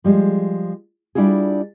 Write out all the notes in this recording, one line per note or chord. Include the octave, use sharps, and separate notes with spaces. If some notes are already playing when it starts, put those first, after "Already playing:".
F3 G3 G#3
G3 D4 E4 F4 G#4